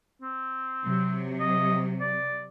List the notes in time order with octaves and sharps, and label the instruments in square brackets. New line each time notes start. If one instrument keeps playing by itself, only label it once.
[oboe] C4
[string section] C3 F#3
[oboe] D#5
D5